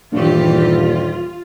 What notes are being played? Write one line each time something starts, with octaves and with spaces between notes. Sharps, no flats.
D#1 G2 E3 A#3 D4 F4 G4